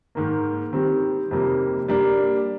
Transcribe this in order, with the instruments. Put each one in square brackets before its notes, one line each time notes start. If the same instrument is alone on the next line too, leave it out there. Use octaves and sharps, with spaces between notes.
[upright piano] G#2 D#3 A#3
D#3 G3 C4 G4
F2 C3 G3 A#3 D#4
G3 A#3 D4